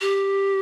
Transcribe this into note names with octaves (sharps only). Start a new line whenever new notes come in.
G4